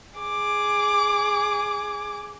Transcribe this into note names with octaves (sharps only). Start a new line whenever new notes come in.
G#4 D6